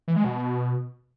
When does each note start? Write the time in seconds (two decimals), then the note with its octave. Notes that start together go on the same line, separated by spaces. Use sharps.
0.08 E3
0.16 G#3
0.24 B2